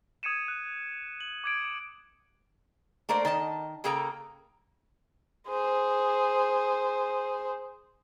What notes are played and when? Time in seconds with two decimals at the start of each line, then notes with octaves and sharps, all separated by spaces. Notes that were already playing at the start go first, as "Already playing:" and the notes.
0.23 D#6 G#6 C#7 D#7 E7
0.48 F#6
1.21 F#7
1.44 D6 G#6 D7
3.09 A3 A#3 A#4 C5 D5
3.25 D#3 D#5 A5
3.84 C#3 A#3 G#4 A4 G5 A#5
5.49 G#4 C5